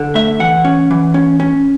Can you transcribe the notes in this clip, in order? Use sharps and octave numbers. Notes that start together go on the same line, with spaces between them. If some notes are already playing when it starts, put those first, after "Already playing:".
Already playing: D3
A3 E5
E3 F#5
C#4
E3
C#4
C#4